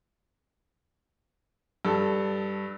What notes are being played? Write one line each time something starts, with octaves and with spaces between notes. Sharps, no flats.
G2 A4